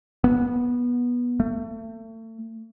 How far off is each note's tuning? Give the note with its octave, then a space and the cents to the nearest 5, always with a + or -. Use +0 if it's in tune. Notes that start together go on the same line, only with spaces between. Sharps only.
B3 -15
A3 +35